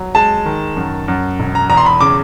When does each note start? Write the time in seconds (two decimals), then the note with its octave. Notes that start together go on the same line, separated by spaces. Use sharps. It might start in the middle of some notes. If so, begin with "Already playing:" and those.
Already playing: F#3
0.15 G#3 A5
0.46 D#3
0.77 F#2
1.08 F#2
1.40 E1
1.55 A#5
1.70 E2 A#5
1.77 C6
1.86 B5
2.00 C#3 D6